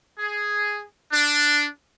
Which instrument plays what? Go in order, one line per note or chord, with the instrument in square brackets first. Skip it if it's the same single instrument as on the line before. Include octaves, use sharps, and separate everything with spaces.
[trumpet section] G#4
D4